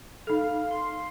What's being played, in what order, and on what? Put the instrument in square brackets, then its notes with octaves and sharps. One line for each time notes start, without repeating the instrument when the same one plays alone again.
[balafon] D#4 A4 [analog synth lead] F5
[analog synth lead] C6